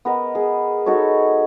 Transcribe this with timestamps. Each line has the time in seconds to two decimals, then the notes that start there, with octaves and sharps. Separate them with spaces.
0.05 B3 A#4 D#5
0.35 G#4
0.86 D#4 F#4 A4 C#5